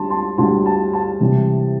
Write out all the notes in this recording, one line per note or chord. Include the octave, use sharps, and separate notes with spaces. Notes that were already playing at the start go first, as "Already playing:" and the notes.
Already playing: D2 D3 G3 A5 C6
A5 C6
D2 D3 G3 A5 C6
A5
A5
C3 E3 G3